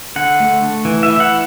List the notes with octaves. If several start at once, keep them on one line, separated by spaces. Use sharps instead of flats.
D3 F#5
A3
A3
E3
E5
E3
F#5